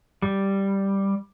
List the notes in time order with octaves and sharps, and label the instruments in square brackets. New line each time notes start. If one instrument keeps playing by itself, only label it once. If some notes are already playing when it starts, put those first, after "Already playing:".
[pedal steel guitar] G3